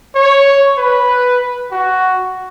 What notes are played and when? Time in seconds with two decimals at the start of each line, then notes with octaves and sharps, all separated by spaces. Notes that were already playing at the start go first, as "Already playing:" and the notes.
0.15 C#5
0.78 B4
1.72 F#4